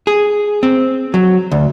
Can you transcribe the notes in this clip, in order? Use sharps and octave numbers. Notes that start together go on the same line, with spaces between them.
G#4
C4
F#3
D2